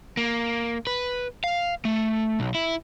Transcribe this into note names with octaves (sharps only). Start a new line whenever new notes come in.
A#3
B4
F5
A3
B1
E4